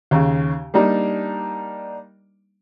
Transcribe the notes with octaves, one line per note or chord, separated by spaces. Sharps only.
D#2 C#3
G3 A#3 D4 D#4